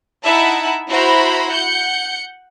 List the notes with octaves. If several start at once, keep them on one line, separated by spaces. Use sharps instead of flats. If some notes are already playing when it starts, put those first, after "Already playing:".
D#4 E4 E5 F#5 A5
E4 F#4 C5 A#5 B5
F#5 G6 C#7